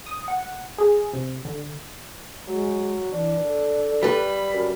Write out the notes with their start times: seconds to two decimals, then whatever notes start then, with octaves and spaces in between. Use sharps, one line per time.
0.06 D#6
0.28 F#5
0.78 G#4
1.13 C3
1.45 D3
2.48 F#3 G#3
3.12 E3 D4
3.44 A4
4.03 G3 B4 B5
4.54 F#2 A#4